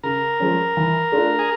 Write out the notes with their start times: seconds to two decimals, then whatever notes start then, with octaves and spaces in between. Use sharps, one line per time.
0.03 C#3 A#4
0.40 F3 G#3 C#4
0.77 E3
1.12 A3 D4 F4
1.39 G#4